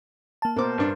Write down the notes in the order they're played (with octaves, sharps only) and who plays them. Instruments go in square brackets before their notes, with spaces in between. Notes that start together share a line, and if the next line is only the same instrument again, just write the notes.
[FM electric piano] A#3 A5
[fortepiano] B2 D6 [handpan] A#4 C5
[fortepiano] G2 D4